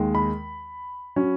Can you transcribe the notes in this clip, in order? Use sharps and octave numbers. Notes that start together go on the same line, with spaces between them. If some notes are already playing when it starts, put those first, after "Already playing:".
Already playing: D#2 D#3 G#3
B5
F#3 C#4